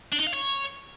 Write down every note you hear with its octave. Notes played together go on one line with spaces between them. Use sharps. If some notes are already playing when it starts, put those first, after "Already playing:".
D4
D#4
F5
C#5